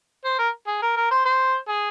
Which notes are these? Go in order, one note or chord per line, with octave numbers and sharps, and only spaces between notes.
C5
A#4
G#4
A#4
A#4
C5
C5
G#4